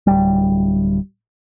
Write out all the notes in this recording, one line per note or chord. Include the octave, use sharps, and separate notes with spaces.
D1 G3